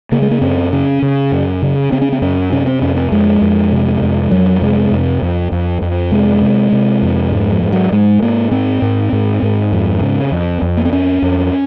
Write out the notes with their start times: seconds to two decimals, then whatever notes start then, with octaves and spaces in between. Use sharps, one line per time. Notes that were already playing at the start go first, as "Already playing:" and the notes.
0.12 C#3 A#3
0.22 G#3
0.31 A#3
0.41 F#2 C4
0.72 C#3 C#4
1.02 C#3
1.32 F#2
1.62 C#3
1.92 C#3 C4
2.01 C#4
2.12 C4
2.22 F#2 C#4
2.52 C3 C#4
2.67 C4
2.82 F2 C#4
2.96 C4
3.12 F2 G#3
3.42 F2
3.72 C3
4.02 F2
4.31 F2 F#3
4.62 C3 G#3
4.91 F2
5.22 F2
5.52 F2
5.82 F2
6.12 C3 G#3
6.42 C3
6.72 C3
7.02 F2
7.32 G#2
7.52 F3
7.63 G#2
7.73 F#3
7.92 G#2 G#3
8.22 G#2 A#3
8.51 G#2 C4
8.82 G#2
9.13 G#2
9.43 G#2
9.73 F2
10.01 C#3
10.32 F2
10.62 F2
10.77 A#3
10.85 C4
10.92 F2 C#4
11.22 F2